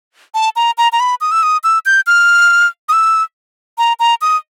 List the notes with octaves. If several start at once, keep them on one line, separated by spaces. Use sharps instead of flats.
A5
A#5
A#5
A#5
B5
D#6
E6
D#6
E6
G6
F6
D#6
E6
A#5
A#5
D#6